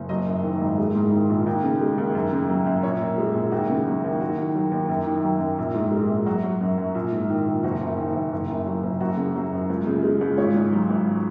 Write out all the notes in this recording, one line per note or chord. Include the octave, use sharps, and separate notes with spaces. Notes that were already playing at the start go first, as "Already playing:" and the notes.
Already playing: F#1
F#3 D#5
F#2
D#3
G#1
G#3
G#2
D#3
A#1
D#2
C#3
G#3
D#2
F#2
C#3
F#3
F#2
A#1 C#5
A#2
G#3
A#1
D#2 F#4
C#3
F#3
D#2
D#2 F#4
D#3
F#3
D#2
F#2
D#3
F#3
F#2
A#1
G#2
G#3
A#1
F#3 F#4
F#3
F#2
F#2
A#1
G#2
D#3
A#1
F#1 F#4
F#2
D#3
F#1
F#1
F#2
F#3
F#1
F#2 F#4
C#3
F#3
F#2
C#2
C#3
G#3
C#2
G#1 C#5
G#2
F#3
G#1